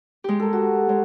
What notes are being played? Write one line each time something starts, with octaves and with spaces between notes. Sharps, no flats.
G#3 G4
A4 A#4
F#4
G#3 C#5